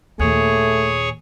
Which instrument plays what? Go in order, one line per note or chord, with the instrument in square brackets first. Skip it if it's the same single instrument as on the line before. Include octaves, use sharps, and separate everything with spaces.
[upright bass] D#2 A#2 [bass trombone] A3 [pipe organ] G#4 C#5